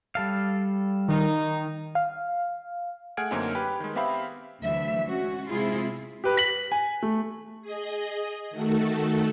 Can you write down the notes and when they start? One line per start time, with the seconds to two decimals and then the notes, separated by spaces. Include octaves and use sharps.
0.15 G3 A4 F5
1.08 D#3 D#4
1.95 F5
3.17 A3 G#4 F#5 F6 G#6 D7
3.31 F#2 D3 A#3 C4 C#4 D#4
3.55 G4 B4
3.80 D#3 G#3
3.95 B3 C4 G4 E5 F5 B5
4.61 D2 E3 F#3 A3 E5
5.06 G#3 C#4 F#4
5.51 C3 G#3 C4 E4 F4 G#4
6.24 G4 B4
6.37 B6 F#7
6.72 G#5
7.02 A3
7.62 G#4 D#5
8.51 D#3 A3 F#4 A4